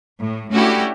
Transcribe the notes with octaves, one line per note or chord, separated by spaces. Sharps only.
A2
A3 C#4 D4 E4 F#4 G4